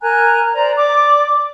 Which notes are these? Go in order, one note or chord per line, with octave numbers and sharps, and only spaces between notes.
A#4 G#5 A#5 F#6
C5 D5 A#5
D5 D6